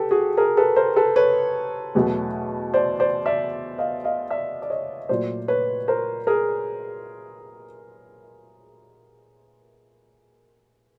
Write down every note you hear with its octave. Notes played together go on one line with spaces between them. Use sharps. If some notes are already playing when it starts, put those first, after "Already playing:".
Already playing: G4 A4 B4
F#4 G#4
G#4 A#4
A4 B4
A#4 C5
A4 B4
B4 C#5
E2 B2 F#3 A3
C5 D5
C5 D5
D5 E5
D#5 F5
D#5 F5
D5 E5
D5
C#5 D#5
A#2 F#3 A3 C5 D5
B4 C#5
A#4 C5
G#4 A#4